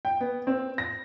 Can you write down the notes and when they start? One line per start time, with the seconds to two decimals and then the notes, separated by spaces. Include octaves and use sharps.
0.05 G5
0.21 B3
0.47 C4
0.78 A#6